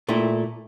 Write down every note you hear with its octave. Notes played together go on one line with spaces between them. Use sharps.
A#2 A3 E4